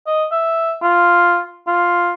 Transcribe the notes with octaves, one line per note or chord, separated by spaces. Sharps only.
D#5
E5
F4
F4